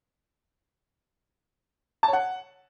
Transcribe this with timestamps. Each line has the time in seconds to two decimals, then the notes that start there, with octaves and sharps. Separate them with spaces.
2.03 A5
2.08 C#5
2.13 F#5